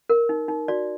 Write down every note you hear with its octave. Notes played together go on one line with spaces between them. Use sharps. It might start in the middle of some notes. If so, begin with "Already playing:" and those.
A#4
D#4
D#4
F#4 D5